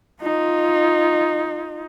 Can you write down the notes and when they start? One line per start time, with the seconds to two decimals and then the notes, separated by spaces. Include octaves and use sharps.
0.22 D#4 F4